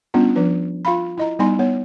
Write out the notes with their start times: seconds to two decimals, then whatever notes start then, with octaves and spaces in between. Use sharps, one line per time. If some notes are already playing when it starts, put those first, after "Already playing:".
0.14 G3 B3 C#4 D4 F4
0.36 F3 D4 B4
0.85 F4 F5 B5
1.17 E4 D#5 A#5
1.39 G3 B3 D#4 G#5 C6
1.59 B3 C#5